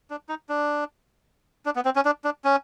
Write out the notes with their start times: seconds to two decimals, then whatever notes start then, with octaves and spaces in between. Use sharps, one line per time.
0.10 D4
0.29 D#4
0.49 D4
1.66 D4
1.76 B3
1.85 C4
1.96 C#4
2.05 D4
2.24 D4
2.44 C#4